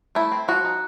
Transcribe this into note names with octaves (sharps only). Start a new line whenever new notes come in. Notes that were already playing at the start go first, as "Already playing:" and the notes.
A3 E4
C4
F3 F#4
D#4